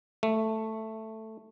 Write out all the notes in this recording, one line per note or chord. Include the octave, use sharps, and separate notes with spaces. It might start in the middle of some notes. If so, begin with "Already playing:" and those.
A3